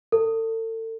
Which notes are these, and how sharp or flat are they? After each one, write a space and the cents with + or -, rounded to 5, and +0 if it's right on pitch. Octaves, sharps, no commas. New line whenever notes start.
A4 +35